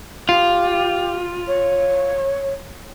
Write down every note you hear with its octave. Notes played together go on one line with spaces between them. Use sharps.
F4 G4
C#5